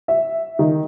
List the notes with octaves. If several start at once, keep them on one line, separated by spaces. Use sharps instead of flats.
E5
D#3